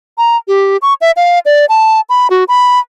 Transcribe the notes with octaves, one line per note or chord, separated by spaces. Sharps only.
A#5
G4
C#6
E5
F5
D5
A5
B5
F#4
B5